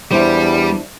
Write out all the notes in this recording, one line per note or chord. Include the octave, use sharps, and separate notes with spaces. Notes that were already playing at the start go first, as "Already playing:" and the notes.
E2 G3 D4 E4 C5